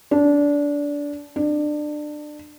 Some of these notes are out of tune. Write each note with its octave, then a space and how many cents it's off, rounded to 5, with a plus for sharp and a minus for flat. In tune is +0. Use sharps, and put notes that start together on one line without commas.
D4 -20
D4 +25